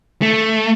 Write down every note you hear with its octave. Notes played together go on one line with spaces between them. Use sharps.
A3